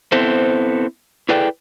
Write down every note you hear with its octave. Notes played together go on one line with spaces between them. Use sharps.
B3 C4 E4 A4 C5
E4 G#4 A4 B4 D5 G5